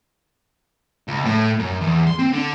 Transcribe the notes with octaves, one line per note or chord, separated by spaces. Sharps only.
C#2
A2
F#2
E2
C6
C4
D3